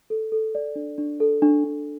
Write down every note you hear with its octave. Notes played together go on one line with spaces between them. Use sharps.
A4
A4
D5
D4
D4
A4
D4
D4